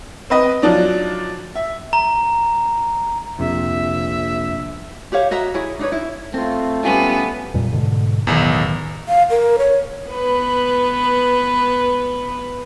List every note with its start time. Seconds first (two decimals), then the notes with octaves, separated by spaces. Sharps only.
0.30 C4 B4 D#5
0.62 F3 F#3 D4 D#4
1.55 E5
1.93 A#5
3.39 A#1 F2 C3 E5
5.12 G4 C5 C#5 F5
5.31 F#4 D#5 E5 A#5
5.54 E4 G#4 C#5
5.79 D4 D#4 B4 C#5
5.92 E4
6.34 A3 C4 F4
6.83 G3 B3 C#4 F4 G4 G#5
7.54 F2 A#2 G3
7.72 G#2 B2 D3
8.27 B1 E2 A2 D#3
9.08 F5
9.30 A#4
9.58 C#5
10.09 B3 B4